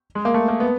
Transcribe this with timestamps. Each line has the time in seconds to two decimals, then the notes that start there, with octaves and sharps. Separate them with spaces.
0.15 G#3
0.25 A#3
0.34 A3
0.48 A#3
0.60 B3